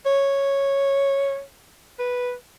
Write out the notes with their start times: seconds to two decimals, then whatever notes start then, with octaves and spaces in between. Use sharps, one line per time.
0.06 C#5
1.99 B4